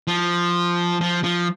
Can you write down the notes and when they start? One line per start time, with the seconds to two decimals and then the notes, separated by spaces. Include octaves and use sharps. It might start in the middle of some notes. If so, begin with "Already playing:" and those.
0.07 F3
1.01 F3
1.24 F3